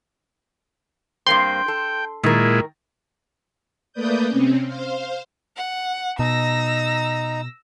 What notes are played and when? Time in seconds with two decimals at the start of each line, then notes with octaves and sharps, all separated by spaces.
1.27 G2 A#3 C4 G5 C6
1.68 A4
2.23 A#2 D#3 G#3 E4 A#4
3.93 A3 A#3 B4 D5 D#6 G6
4.28 C3 C4 C#4
4.65 C5 F5
5.57 F#5
6.19 B2 D#4 A#5 E6 A#6